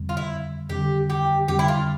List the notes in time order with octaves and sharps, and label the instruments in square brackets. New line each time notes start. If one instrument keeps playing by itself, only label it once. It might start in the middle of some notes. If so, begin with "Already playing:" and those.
Already playing: [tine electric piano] F2 D3 G3
[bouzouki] F4
E4
[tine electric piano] F2 D3 G3 [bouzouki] G4
[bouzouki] G4
[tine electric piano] F2 D3 G3 [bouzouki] G4
[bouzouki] E4
F4